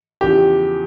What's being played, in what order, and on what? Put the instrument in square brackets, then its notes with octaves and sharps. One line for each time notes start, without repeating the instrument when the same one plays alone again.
[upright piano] E2 C#3 F3 [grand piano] G4